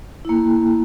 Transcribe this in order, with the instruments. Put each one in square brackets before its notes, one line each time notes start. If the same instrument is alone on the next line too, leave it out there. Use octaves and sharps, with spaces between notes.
[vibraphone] A#3 E4